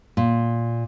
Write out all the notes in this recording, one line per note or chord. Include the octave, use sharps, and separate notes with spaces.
A#2